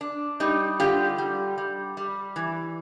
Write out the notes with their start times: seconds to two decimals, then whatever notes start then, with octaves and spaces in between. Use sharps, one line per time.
0.01 D4
0.40 G3 D#4
0.80 D3 F4 G4
1.18 G3
1.58 G3
1.97 G3
2.36 E3